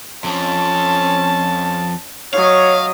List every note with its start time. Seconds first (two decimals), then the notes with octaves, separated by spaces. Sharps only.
0.24 F2 F3 C#4 A5
2.34 F#3 C#5 D#5 F5